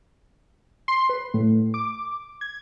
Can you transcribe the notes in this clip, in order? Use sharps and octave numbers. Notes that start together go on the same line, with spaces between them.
C6
B4
A2
D6
G#6